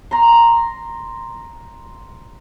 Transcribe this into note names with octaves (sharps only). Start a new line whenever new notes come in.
A#5 C6